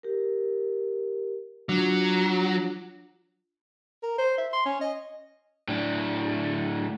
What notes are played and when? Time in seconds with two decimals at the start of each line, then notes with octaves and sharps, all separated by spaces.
0.03 G4 A#4
1.69 F#3 D4 F4
4.03 A#4
4.18 C5
4.38 E5
4.53 C6
4.66 C#4
4.81 D#5
5.68 A2 D4